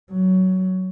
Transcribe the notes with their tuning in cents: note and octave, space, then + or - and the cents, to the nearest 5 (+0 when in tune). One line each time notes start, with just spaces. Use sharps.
F#3 +15